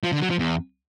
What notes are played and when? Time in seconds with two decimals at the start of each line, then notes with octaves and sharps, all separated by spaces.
0.04 F3
0.12 D3
0.21 F#3
0.30 F3
0.39 E2